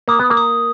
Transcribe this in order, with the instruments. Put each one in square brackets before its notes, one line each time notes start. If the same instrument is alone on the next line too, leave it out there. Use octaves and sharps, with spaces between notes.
[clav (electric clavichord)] A#3 [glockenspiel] D#6
[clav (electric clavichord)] B3
A#3
[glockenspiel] D#6